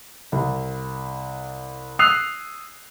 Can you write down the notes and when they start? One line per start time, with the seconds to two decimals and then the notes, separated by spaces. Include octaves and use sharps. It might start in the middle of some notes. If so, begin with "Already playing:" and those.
0.32 C2
1.99 D#6 E6 F#6 C7 F7